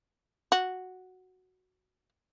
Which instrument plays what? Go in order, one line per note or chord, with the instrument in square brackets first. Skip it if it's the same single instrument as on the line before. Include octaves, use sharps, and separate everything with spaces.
[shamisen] F#4